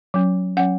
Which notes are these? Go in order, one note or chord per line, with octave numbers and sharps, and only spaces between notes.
F#3 C#4
F#3 C#4 F#5